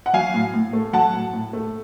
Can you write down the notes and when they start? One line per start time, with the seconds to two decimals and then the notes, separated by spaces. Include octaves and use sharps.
0.06 F#5
0.13 F#3 F5 G#5
0.34 A2
0.54 A2
0.73 A3
0.93 F#3 F#5 A5
1.14 A2
1.33 A2
1.53 A3